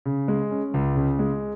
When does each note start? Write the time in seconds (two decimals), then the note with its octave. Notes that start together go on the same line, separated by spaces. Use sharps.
0.05 C#3
0.28 G#3
0.51 C#4
0.74 C#2
0.96 C#3
1.19 G#3